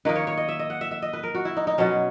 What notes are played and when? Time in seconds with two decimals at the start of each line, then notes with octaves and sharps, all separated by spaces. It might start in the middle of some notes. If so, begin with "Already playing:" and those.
0.05 D#3 A#3 D#4 B4
0.16 C#5
0.27 C#5
0.37 D#5
0.48 E5
0.59 D#5
0.70 F#5
0.81 E5
0.91 E5
1.02 D#5
1.13 B4
1.23 A#4
1.35 F#4
1.45 E4
1.57 D#4
1.67 D#4
1.78 B2 F#3 C#4